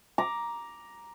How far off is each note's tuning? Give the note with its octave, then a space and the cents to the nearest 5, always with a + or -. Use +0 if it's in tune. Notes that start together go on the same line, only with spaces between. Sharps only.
A#5 +10 D6 +0